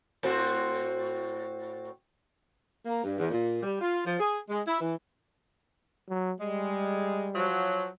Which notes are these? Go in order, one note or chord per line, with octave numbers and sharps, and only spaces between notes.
A2 C4 F#4
A#3
G2
E2
A#2
G3
F4
F3
G#4
G#3
E4
E3
F#3
G3 G#3
F3 F#3